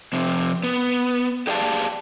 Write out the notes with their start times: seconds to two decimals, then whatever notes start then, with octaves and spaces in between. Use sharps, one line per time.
0.13 F2 C3
0.64 B3
1.47 G4 G#4 D5 F5 G#5 A5